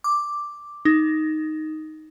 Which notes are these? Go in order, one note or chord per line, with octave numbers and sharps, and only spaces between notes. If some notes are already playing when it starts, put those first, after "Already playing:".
D6
D#4